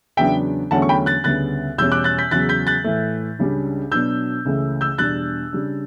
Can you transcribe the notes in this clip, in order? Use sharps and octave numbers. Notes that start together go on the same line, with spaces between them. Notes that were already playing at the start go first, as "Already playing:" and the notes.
E2 C#3 F#3 B3 D4 E5 G5
E2 D3 F#3 A3 C#4 F#5 A5
C#6
G5 B5
F#6 A6
D2 C#3 G3 B3 F#6 A6
E2 B2 G3 C#4 E6 G6
D6 F#6
F#6 A6
G6 B6
E2 C#3 F#3 F#6 A6
G6 B6
F#6 A6
A2 E3 A3
C#2 C#3 G3 D4
B2 F#3 B3 D4 E6 G6
C#2 C#3 E3 A3
E6 G6
E2 B2 G3 D4 F#6 A6
C#3 G3 D4